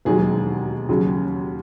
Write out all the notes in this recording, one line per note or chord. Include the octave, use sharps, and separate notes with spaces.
E1 D#2 D#3 F#3 G#4
D#2 C#3 F#3